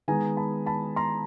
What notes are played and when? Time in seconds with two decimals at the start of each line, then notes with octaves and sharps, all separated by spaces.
0.08 D#3 G#3 B3 G#5 A#5
0.37 A5 B5
0.66 A5 B5
0.96 A#5 C6